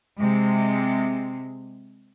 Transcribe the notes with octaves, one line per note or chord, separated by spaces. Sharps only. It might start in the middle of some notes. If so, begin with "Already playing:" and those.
C3 G#3